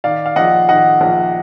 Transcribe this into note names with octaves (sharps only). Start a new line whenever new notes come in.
D#3 D5 F5
F5
A#1 D#5 F#5
D#3 D#5 F#5
A#1